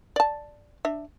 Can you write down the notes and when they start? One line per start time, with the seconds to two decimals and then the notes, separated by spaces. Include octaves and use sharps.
0.16 D5 A5
0.85 D4 E5